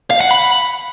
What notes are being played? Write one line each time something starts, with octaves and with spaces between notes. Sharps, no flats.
F5
F#5
B5